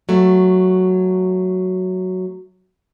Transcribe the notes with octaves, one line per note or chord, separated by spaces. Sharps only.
F#3 A3